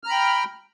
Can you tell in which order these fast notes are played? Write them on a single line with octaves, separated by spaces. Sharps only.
F6 A#5 B5 G5